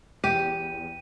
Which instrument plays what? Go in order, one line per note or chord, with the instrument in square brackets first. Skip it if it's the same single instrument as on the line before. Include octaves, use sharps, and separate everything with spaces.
[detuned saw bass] E2 [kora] G4 [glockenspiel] D#7